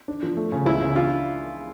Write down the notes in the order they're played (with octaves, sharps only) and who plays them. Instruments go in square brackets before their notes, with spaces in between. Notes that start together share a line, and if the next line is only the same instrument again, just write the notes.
[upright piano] D4
F3
A3
C#3
[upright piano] C#2 [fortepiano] E4
[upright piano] C#3
[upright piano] D4 [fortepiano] F4